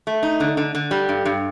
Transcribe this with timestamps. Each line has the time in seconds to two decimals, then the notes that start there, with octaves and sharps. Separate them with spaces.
0.07 A3
0.23 D#4
0.40 D3
0.57 D3
0.75 D3
0.91 G3
1.09 G2
1.25 G2